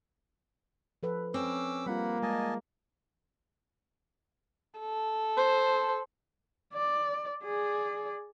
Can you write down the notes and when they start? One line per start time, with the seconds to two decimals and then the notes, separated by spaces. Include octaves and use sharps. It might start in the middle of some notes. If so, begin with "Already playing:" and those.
1.03 F3 A4 B4
1.34 C4 C#4 D6 E6
1.86 G3 A#3 F4 F#5 B5
2.23 G#3 D#5 G#5 A5
4.79 A4
5.37 C5
6.73 D5
7.43 G#4 D5